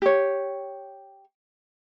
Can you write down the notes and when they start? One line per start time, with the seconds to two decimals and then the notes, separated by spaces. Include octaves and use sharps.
0.02 G4 C#5